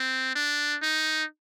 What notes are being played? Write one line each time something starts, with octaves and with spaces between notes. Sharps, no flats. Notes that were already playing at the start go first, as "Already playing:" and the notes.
Already playing: C4
D4
D#4